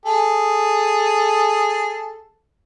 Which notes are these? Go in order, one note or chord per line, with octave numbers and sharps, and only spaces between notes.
G#4 A4